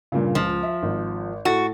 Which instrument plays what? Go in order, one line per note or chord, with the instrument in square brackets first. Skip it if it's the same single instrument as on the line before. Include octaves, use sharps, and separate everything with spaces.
[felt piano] G2 A#2 C#3
[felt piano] C#2 [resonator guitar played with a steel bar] F3
[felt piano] E5
G#1
[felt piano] A2 A4 A6 [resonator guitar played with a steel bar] F#4